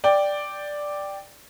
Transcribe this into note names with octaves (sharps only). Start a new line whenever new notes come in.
D5 G5